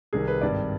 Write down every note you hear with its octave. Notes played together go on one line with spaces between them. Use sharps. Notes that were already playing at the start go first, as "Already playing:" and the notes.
C2 C3 D#3 G#4
B4
G#1 G2 D#3 D5